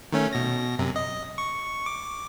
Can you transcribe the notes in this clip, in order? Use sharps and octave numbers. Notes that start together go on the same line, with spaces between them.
D#3 A3 C#4
B2 A#6
F#2 C3
D#5
C#6
D6